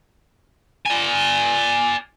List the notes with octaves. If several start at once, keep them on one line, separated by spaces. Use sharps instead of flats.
D5 G#5